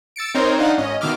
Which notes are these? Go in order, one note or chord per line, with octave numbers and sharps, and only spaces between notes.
E6 A6 C#7 D7
C4 D#4 A#4 C5 C#5
D4 D#4 F5 F#5
G#1 C#4 D#5
B2 D#3 E5 D6 F6